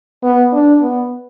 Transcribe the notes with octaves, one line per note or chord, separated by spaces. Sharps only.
B3
D4
B3